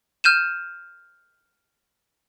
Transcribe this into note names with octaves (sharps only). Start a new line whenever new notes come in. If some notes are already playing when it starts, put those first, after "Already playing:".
F6 G6 D#7 E7